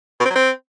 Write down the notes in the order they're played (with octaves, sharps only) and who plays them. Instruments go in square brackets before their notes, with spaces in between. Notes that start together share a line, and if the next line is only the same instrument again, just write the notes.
[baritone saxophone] B2
C4
F#3
C4